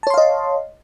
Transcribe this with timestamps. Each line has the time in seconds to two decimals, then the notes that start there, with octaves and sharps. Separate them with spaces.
0.03 A5
0.07 C#5
0.10 C6
0.14 F5
0.18 D#5